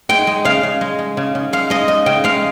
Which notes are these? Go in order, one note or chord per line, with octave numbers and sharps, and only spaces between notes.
G#3 G5
G#3
C#3 F5
C#3
G#3
G#3
C#3
C#3
G#3 F5
G#3 D#5
C#3 D#5
C#3 G5
G#3 F5